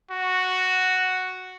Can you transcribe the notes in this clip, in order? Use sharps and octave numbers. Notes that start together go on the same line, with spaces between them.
F#4